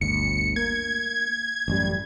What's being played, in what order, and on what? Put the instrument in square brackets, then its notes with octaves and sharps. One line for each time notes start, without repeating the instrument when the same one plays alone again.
[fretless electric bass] G1 D2 [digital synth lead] C#7
[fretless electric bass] A#3 [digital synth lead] G#6
[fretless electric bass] A1 F#2 G3